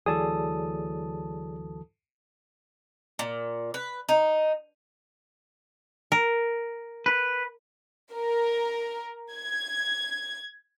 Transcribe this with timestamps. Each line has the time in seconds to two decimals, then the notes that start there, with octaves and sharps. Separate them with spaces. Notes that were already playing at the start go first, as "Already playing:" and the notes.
0.06 D2 E3 F#3 G#4 A4 D5 A5 D#6
3.19 A#2
3.74 B4
4.09 D#4
6.12 A#4
7.06 B4
8.14 A#4
9.34 G#6